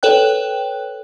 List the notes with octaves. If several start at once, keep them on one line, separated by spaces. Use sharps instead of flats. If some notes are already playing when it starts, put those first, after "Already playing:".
A4 B4 C#5 G5 F#6